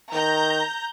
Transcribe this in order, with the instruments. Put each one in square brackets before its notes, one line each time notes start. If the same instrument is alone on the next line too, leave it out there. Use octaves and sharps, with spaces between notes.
[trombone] D#3 [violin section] A#5 G6